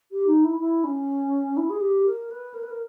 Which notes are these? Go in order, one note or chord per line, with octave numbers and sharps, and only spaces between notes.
G4
D#4
E4
E4
C#4
E4
G#4
G4
A#4
B4
A#4
B4
A#4